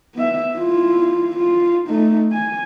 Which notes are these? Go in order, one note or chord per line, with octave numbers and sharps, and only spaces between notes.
B3 E5
E4 F4
F4
A3 D#4
G#5